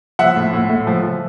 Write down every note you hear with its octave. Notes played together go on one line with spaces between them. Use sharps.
F3 E5 F#5
A2
A2
A2
F3
F3